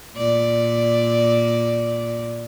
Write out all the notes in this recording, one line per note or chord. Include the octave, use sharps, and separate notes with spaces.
A#2 D5